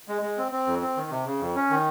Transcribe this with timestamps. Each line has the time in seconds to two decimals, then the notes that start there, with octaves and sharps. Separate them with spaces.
0.08 G#3
0.22 G#3
0.37 C4
0.52 C4
0.66 F2
0.82 C4
0.96 D#3
1.10 C3
1.26 C#3
1.40 F2
1.55 C#4
1.70 D#3